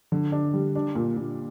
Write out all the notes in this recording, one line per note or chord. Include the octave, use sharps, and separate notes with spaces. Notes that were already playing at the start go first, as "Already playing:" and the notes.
D3
D4
G3
D4
A#2
A#2